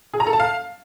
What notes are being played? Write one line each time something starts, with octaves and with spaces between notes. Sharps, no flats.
G#4
A#5
A4
A5
F5